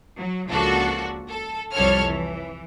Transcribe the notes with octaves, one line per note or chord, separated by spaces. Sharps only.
F#3
C#2 F3 A#3 D4 F#4 A4
A4
C2 F2 G3 A4 C#5 F6
E3